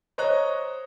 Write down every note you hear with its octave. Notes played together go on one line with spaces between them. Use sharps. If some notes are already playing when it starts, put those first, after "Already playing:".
C5 C#5 D#5 A#5 C#6 F#6